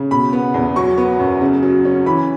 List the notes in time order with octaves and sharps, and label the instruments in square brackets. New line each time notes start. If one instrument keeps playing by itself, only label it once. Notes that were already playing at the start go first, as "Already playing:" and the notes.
Already playing: [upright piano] C#3
B2 B5
B3
E2
F#3 C#6
B3
F#2
C#3
F#3
C#4
E3 B5